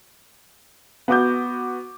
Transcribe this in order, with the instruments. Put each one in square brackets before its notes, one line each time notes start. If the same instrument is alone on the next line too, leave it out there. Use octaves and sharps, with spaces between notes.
[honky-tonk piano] B3 F#4 D6 G6